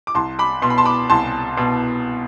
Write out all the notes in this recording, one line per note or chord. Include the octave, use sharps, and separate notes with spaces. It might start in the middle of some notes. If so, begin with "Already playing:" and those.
D6
C2 A5 C6
B5 D6
B2 C6
B5
A5 C6
B5 D6
C2 A5 C6
B2